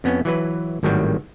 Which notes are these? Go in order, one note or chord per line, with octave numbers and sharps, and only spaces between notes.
F2 B3 C#4
E3 F#3 B4
G#1 A2 D#3 F#3 G3 G5